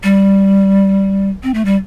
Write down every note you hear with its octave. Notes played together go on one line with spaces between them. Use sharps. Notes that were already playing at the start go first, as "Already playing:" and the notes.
G3
C4
A3
G3